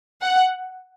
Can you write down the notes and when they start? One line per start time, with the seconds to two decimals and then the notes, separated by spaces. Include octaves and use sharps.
0.22 F#5